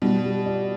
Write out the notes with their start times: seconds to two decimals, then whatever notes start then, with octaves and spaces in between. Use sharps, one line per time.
0.02 B2 G3
0.24 G4
0.46 D5